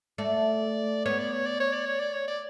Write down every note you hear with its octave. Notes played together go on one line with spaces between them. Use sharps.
A3 D5
B3 C#5
D5
C#5
D5
C#5
D5
C#5
D5
C#5
D5